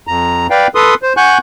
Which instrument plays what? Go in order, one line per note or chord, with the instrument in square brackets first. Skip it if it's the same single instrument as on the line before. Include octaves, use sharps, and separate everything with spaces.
[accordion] F2 A#5
B4 D5 F5 G5
A4 B4 C6 D#6
C5
F#5 G#5 C#6 F#6 G6